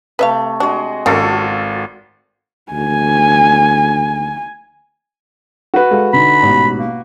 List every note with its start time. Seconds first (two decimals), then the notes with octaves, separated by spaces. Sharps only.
0.19 C3 A3 B4 E5 F5
0.60 G#3 D4 F#4
1.06 G#1 C#3 A#3 F4 F#4 A4
2.72 D2 G#5
5.74 F#4 B4
5.91 G#3 A4 F5
6.13 D3 D#4 B5
6.42 A1 G#2 B2
6.79 A#3